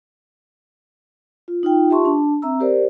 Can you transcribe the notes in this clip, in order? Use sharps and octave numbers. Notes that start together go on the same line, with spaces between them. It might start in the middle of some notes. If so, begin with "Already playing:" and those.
F4
D#4 F4 G5
F4 G4 E5 A5 C6 C#6
D4 A5
C4 E5 A#5 E6
G4 A#4 C5 D5